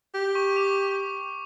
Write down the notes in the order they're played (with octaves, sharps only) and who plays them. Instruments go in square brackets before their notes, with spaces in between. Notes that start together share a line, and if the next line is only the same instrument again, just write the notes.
[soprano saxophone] G4
[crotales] C#6
D6